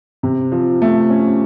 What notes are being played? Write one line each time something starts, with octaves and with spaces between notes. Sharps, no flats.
C3
F3
A3
C#4